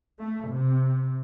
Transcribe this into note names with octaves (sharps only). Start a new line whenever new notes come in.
A3
C3